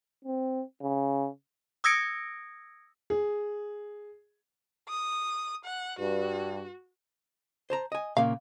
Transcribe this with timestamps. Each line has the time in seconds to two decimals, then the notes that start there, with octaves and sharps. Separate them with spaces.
0.25 C4
0.82 C#3
1.84 D#6 E6 G#6 A#6 C#7 D7
3.10 G#4
4.89 D#6
5.64 F#5
5.99 G2 F#4
7.70 C5 A5 A#5
7.92 D#5 G#5
8.17 A#2 C#3 A#3 F5